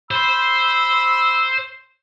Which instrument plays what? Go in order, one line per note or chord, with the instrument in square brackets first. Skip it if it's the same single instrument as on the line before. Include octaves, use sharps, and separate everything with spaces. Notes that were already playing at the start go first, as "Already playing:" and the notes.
[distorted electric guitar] C5 C6 [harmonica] B5 E6